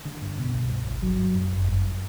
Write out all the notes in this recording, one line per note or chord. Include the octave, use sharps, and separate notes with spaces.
D3
G2
B2
C2
G2
G1
F#3
G2
F#2
G1
G2